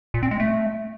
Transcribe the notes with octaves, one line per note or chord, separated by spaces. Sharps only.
A#2
C4
G#3
A3